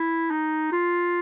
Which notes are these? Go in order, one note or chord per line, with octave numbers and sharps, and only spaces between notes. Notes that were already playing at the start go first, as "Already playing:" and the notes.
Already playing: E4
D#4
F4